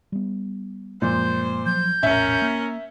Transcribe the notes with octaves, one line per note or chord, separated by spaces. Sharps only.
G3 B3
F#2 A#2 F3 G#3 C5 G6
F3 F#3 G6
E1 A#1 A2 C#4 A#4 E5
A#3